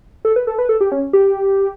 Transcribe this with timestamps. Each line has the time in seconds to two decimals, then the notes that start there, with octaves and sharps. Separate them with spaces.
0.25 A4
0.36 B4
0.47 A4
0.59 B4
0.69 A4
0.81 G4
0.92 C#4
1.13 G4